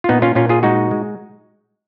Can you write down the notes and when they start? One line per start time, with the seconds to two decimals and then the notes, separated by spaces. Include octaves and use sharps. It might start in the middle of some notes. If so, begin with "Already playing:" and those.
0.04 F4
0.09 A#2 B3 D#4
0.22 C#4 F4
0.35 A#2 C#4 F4
0.49 F4 G#4
0.63 G#3 D#4 F#4
0.91 G#3